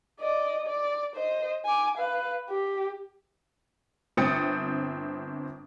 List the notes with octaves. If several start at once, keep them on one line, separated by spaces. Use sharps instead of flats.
D5 D#5
D5
C5 D#5
G#5 D6
B4 F5
G4
G1 C4 G5 D#6 A6 C#7